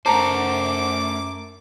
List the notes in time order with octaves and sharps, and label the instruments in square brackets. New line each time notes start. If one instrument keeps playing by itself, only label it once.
[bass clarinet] F#2 [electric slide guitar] A3 A4 C5 [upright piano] A5 A#5 [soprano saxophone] D6